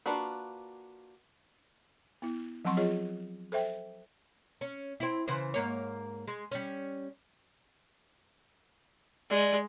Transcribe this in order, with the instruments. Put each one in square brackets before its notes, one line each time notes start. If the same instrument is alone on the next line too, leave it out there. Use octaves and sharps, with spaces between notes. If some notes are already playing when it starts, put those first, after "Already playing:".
[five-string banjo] A#3 D4 F4 F#4 B4
[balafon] B3 E4
F3 F#3 C4 F#5 C6 C#6
F4 G#4 C#5 D#5
A4 C5 E5 G5
[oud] C#4
C4 E4
C#3 E3 C5
G#2 A#3 C#5
G#3
G3 C#4
[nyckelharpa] G#3 [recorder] D5